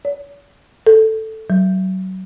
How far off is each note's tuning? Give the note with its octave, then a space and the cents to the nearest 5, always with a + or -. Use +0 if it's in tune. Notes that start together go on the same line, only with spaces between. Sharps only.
C#5 +45
A4 +0
F#3 +25